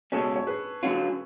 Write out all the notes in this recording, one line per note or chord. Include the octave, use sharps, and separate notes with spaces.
C#2 B2 G#3 C#4 A4 C#5
C#5
G#4 B4
D3 F#3 C#4 F4